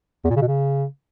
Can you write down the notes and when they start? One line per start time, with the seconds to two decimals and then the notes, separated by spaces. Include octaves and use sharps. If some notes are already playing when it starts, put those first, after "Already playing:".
0.24 E2
0.30 A#2
0.36 C#3
0.42 B2
0.47 C#3